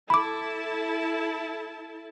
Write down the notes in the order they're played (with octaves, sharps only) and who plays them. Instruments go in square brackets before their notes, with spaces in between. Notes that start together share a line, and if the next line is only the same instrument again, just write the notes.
[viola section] E4 A4 A5 [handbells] B5 D6